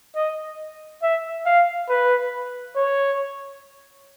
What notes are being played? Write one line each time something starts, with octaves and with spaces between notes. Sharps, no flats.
D#5
E5
F5
B4
C#5